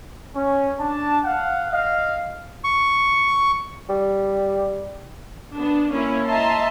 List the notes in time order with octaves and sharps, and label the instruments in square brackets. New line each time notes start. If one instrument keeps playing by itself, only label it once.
[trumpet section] C#4
D4 A5
F5 F#5
D#5 F5
[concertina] C#6
[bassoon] G3
[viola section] B3 D4
A#3 C#4 E4
D#5 E5 A5 A#5 C6